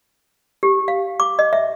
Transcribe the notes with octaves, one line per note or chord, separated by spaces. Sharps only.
G4
F5
D6
D#5
E5